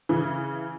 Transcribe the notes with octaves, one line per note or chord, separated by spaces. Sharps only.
C#3 E3